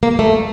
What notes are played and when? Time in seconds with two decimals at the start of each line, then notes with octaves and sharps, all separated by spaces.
0.03 A#3
0.19 A3